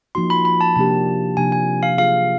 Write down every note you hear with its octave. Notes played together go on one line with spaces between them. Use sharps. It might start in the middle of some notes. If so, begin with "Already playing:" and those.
F3 A#3 D#4 F#4 C6
B5
B5
A5
C3 F3 A#3 D4 G4 A5
C3 F3 A#3 D4 G4 G#5
G#5
F5
F#3 A#3 D4 F4 G#4 F5